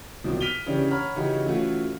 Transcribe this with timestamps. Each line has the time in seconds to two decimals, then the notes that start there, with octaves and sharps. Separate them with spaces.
0.24 C2 B2 D#3 F3 F#3
0.41 F6 B6 D7 D#7 F7 G7
0.66 C#3 E3 C#4 D4 G4
0.91 C#5 F#5 A#5 B5 F6
1.16 C#3 E3 C#4 D#4 F#4 G4
1.46 E3 A3 C#4 F4 F#4